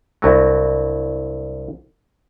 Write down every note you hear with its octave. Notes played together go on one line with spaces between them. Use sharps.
C2 G2 F#3